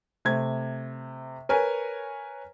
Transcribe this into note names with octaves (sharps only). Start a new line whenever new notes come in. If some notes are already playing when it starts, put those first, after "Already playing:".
C3 A3 G#6
A#4 B4 C#5 G#5